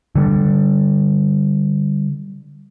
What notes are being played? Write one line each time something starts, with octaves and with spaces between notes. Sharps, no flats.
D3 G3